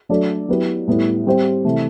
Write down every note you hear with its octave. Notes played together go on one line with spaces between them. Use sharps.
F#3 A3 D4 A4 D5
F#3 B3 E4 G4 B4
A2 G3 B3 E4
G3 C4 G4 C5
C3 E3 A3